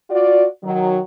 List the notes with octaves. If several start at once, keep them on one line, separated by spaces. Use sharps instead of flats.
F4 F#4 D5
D#3 F#3